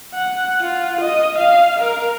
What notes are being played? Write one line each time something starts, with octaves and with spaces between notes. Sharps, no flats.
F#5
F4
D#5
F5
A#4